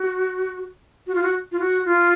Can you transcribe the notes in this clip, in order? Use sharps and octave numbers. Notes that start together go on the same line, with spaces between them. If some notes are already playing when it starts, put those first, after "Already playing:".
Already playing: F#4
F#4
F4
F#4
F4
F#4
F4